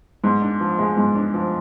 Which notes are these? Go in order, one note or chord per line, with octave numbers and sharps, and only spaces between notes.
G#2
D4
F3
G#3
G#2
D4
F3